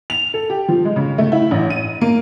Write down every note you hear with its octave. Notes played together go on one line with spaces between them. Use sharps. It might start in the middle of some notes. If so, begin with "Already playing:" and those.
F7
A4
G4
F3
G#3
C#3
A3
E4
A1
D#7
A#3